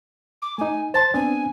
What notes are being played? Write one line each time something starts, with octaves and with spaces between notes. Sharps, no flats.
D6
A3 D#4 G#5
C5 A5 C6 A6
B3 C4 D4 G#5